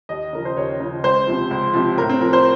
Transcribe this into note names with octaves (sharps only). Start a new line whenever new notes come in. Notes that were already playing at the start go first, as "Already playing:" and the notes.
D#2 D#5
C#3 F3 A#4
C5
D#2 C#5
C#3 F3
C#2 C5
C3 F3
C#2
C3 F3
A2 A#4
C4
F3 A#4
C5